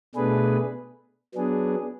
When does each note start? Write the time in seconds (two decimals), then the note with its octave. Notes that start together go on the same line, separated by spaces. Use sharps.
0.15 B2 A3 D4 G#4 B4
1.34 F#3 B3 D4 G#4